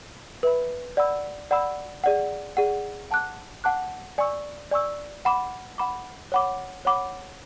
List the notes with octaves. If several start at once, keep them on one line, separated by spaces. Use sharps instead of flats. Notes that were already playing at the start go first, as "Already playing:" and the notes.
B4 E5 B5
D5 F#5 B5 E6
D5 F#5 B5 E6
G#4 D5 F#5
G#4 D5 F#5
F#5 A5 D6 F#6
F#5 A5 D6 F#6
D5 G#5 C#6 E6
D5 G#5 C#6 E6
F#5 B5 D6
F#5 B5 D6
C#5 F#5 B5 D6
C#5 F#5 B5 D6